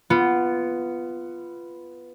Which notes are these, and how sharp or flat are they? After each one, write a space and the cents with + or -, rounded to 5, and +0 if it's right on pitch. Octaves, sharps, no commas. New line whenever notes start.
B3 +0 F4 -15